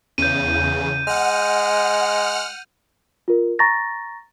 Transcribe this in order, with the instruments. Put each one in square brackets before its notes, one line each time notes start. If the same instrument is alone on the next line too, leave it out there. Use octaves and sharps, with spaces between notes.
[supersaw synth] E2 C#3 [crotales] G6 D#7
[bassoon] G#3 [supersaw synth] F#5 F6
[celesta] F4 A#4
A#5 C#6 A6 A#6